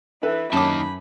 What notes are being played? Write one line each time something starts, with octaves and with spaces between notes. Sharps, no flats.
E3 A4 B4 E5
F#2 D#3 A#3 C#5 A5 B5 D6